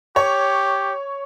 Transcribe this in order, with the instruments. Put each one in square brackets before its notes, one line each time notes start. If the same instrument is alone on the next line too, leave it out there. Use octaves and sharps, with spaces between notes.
[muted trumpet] G4 [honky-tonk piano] C#5